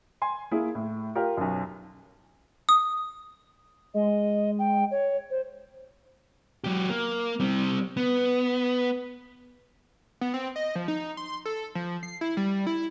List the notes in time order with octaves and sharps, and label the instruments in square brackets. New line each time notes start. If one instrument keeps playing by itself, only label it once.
[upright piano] G#5 C6
A#3 E4 G#4
A2
F4 G4 A#4
B1 F#2
[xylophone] D#6
[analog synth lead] G#3 [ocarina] D#5
[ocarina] G5
C#5
C5
[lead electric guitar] F#3 G4
A#3
G3 C4
B3
[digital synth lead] B3
C4
D#5
F3
D#4
C6
A4
F3
C7
E4
G3
E4